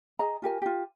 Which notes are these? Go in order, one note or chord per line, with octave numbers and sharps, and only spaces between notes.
G#4 D#5 A#5
F4 G4 A#4 G#5
F4 G4